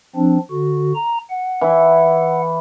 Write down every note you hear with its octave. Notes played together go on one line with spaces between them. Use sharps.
F3 C4 D4
D3 F#4
A#5
F#5
E3 E4